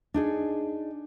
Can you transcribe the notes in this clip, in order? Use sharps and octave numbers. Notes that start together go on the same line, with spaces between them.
D4 D#4 G#4